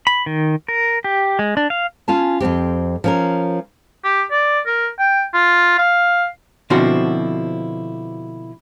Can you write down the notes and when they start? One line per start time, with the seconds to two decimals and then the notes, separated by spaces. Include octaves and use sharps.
0.07 B5
0.26 D#3
0.68 A#4
1.04 G4
1.39 G#3
1.57 D4
1.70 F5
2.08 C#4 F4 G#5 A5
2.40 F2 G#2 C4 G4
3.04 F3 C#4 A#4
4.04 G4
4.31 D5
4.66 A#4
4.99 G5
5.34 F4
5.79 F5
6.70 B2 D3 F3 C4 E4 F#4